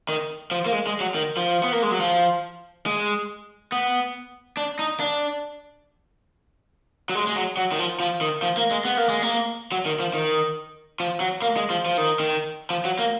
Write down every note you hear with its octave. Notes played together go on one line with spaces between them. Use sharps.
D#3
F3
A#3
G#3
G#3
F#3
D#3
F3
B3
A#3
G#3
F#3
F3
G#3
B3
D4
D#4
D4
F#3
G#3
G#3
F#3
F#3
D#3
F3
F3
D#3
F3
A#3
G#3
B3
A#3
G#3
A#3
F#3
D#3
F3
D#3
F3
F#3
A#3
G#3
F3
F3
D#3
D#3
F3
F#3
A#3